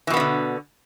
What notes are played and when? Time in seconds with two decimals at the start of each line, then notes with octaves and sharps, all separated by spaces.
0.07 E3
0.10 B2
0.14 B3
0.17 F3
0.20 D3